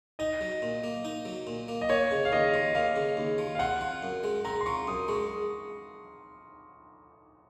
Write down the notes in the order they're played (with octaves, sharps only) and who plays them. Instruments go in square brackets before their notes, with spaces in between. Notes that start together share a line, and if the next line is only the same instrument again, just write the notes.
[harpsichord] D#4 [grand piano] D#5
[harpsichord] F#3
A#2
A#3
D#4
F#3
A#2
A#3
[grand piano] D#5
[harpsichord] A#3 [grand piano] C#5
[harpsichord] C#3
[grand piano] F5
[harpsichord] D#2 [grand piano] D#5
[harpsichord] F3
[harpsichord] A#3 [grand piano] F5
[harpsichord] C#3
D#2
F3
[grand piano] F5
[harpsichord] C4 [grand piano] F#5
[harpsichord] F3
F#2
G#3
[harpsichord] C4 [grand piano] A#5
[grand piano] C6
[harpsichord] F3 [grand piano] C#6
[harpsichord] F#2 [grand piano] D#6
[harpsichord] G#3 [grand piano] C#6